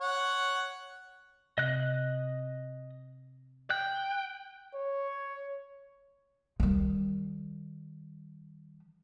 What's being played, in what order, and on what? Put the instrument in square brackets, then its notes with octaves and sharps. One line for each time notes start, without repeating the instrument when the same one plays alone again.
[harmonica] C#5 F#5
[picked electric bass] C3 [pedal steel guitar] D#5 F#6
[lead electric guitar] G5 [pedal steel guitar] F#6
[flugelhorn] C#5
[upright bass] D#3 G3